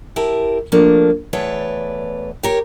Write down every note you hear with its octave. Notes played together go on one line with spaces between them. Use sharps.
E4 G4 A#4 A5
F3 A3 A#3 D4
E2 A3 B4 C#5 D5
G4 A#4 C#5